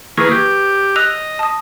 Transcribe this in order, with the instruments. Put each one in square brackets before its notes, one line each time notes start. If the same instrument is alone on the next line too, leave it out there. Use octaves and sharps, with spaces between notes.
[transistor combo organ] E3 A#3 G#4 [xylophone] B4 C#6
[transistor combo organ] G4
[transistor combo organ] D#5 [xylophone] E6 F#6 F7
[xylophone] A5 D#6